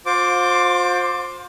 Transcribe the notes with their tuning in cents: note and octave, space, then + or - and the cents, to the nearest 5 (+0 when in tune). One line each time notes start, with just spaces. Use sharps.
F4 +40 C5 +10 D6 +0